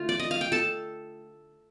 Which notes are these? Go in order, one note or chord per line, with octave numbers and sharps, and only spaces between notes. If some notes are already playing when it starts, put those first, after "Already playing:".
Already playing: D3 A3 F4 F5
D5
D#5
F5
G5
A4 A5